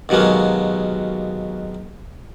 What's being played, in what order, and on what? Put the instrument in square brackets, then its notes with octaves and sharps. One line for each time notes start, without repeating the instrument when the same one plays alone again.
[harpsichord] D#2 B2 F#3 G#3 A#3